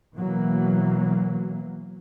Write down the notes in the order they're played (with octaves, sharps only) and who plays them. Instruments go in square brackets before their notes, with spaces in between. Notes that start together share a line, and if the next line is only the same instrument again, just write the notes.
[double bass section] B2 E3 F#3 A#3